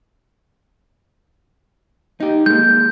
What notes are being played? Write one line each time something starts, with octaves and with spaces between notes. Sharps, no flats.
D#4 G4
G#3 A#3 G6